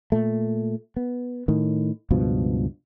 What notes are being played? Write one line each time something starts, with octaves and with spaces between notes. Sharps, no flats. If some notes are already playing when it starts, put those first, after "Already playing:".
A#2 A3
B3
A2 D#3
C#2 G2 B2 F3